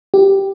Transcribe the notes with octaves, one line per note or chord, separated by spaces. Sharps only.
G4